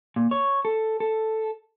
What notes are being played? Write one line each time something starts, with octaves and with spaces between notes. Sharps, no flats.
A#2
C#5
A4
A4